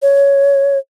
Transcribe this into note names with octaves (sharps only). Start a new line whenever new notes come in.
C#5